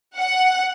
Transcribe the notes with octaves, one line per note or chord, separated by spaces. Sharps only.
F#5